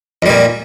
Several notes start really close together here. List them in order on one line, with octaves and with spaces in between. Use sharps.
F2 G3 A#2